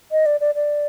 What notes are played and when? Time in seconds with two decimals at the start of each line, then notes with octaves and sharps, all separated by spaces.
0.12 D#5
0.26 D5
0.40 D5
0.55 D5